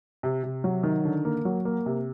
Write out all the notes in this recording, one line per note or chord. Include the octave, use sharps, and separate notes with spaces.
C3
C3
F#3
D#3
D3
A#3
F#3
A#3
C3